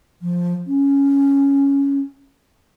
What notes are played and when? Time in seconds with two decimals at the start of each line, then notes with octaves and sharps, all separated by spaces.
0.22 F3
0.67 C#4